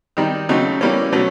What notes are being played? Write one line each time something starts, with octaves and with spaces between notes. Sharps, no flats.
D#3 G3 C4 D#4
C#3 F#3 A3 C4 D#4
E3 G3 A#3 C#4
B2 F#3 A3 C#4